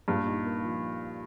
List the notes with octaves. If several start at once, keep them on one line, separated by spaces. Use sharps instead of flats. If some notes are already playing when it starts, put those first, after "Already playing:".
G2 A#2
D#4
A#3
F3